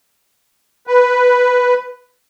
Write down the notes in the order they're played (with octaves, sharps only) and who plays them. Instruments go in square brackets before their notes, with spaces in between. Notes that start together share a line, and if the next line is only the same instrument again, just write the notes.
[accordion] B4